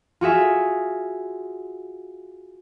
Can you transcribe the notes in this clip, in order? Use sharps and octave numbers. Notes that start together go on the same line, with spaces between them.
F4 F#4 G#4 E5